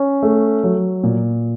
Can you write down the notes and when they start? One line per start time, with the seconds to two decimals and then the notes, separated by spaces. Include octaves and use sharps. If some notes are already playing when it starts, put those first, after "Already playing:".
Already playing: C#4
0.23 A3
0.64 F#3
1.04 A#2